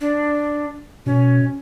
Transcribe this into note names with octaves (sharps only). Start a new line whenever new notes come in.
D4
B2 C#4